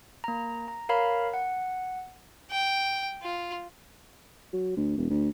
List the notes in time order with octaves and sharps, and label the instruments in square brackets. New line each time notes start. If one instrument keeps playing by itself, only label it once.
[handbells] A#3 A#5
A#5
A#4 C#5 F5 A#5 B5
F#5
[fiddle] G5
F4
[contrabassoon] F#3
D2
E1
D2